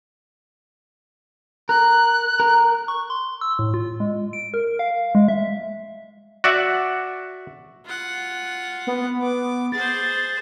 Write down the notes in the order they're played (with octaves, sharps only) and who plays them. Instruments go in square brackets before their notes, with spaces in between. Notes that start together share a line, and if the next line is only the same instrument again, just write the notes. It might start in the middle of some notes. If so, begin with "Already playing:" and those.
[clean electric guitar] A#4 [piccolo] F#6
[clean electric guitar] A#4
[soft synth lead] C#6
C6
E6
A2
F4
G#3
D7
A#4
F5
G#3
E5
[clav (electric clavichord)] F#4 D5 E5 F#5
[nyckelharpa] F4 F#5
[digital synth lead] B3
[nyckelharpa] D6
[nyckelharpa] G#4 C5 [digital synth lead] A6